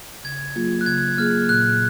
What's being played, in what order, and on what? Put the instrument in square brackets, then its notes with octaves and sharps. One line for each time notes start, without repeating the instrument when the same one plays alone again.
[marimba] C#3 [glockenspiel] G#6
[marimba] F#3 A#3 F4 G#4
[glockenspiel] F#6
[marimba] C#3 [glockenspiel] G#6
[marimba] F#3 A#3 F4 G#4 [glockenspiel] F6
[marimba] A#2 [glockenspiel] F#6